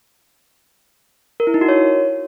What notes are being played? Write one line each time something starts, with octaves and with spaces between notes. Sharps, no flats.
A#4
E4
D#4
F#4
C#5